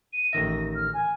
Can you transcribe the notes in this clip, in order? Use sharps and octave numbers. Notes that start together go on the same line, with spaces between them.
D#7
A1 D#3 E5 A#6
F6
G#5